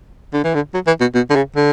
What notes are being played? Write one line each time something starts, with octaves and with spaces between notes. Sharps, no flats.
D3
E3
D3
F#3
E3
B2
B2
D3
C#3
D3